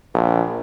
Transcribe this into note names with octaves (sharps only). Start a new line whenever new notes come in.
A#1